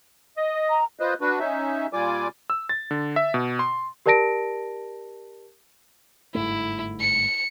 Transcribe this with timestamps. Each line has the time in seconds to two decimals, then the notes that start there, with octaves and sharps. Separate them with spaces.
0.38 D#5
0.70 A#5
1.00 F4 B4 C5 D#5
1.21 D4 F#4 B4
1.40 C#4 D#4 E5
1.93 A#2 G3 F4 D5 G#5 D6
2.50 E6
2.69 A6
2.91 D3
3.16 E5
3.34 B2
3.59 C6
4.06 G4 A#4 D5 A5 A#6 D7
6.34 G1 G#2 A3 E4
7.00 C#7